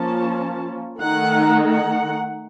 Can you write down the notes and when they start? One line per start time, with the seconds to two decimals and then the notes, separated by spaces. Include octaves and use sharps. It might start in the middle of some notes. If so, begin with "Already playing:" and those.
Already playing: F3 A#3 C#4 A5
1.00 D#3 A3 D#4 F#5
1.66 F#5